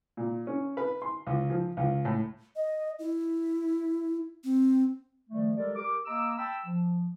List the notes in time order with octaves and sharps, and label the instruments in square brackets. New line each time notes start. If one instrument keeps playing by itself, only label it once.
[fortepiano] A#2
C#4
B4
C6
C#2
F3
C#2
A2
[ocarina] D#5
E4
C4
[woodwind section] D#3 F3 G3 A3
G3 G#3 G4 A4 A#4 D5
G4 A#4 D6
A#3 D#5 A#5 D6 E6
G5 A5 B5 E6
F3